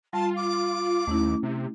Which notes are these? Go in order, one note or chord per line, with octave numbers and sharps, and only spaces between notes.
G3 F4 A5
D6
D#2 A3 C#4 E4
C3